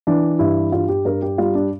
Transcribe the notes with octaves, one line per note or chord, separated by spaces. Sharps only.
E3 D4
G2 E4
G2 F4
G4
G2 A#4
G4
G3 F4
D4